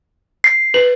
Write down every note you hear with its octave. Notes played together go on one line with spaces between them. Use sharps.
C7
B4